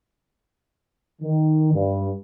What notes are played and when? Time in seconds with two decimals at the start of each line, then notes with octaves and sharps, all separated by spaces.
1.22 D#3
1.73 G2